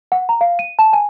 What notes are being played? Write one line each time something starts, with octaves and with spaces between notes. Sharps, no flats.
F#5
A#5
F5
D#7
A5
G#5